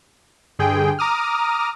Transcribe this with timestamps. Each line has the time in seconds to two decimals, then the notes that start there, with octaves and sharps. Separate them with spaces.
0.59 G2 D3 G#4 G5
0.99 A#5 D6 D#6 F6